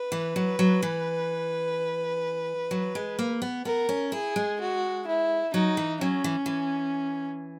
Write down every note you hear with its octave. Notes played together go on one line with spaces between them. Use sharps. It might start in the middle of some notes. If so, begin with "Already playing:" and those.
Already playing: B4
E3
F#3
F#3
E3
F#3
G#3
A#3
B3
B3 A#4
C#4
E4 G#4
G#3
F#4
E4
F#3 D#4
E3
F#3 C#4
E3
E3